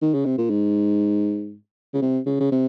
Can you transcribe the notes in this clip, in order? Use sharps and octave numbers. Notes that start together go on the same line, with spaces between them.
D#3
C#3
C3
A#2
G#2
C#3
C3
C#3
C#3
C3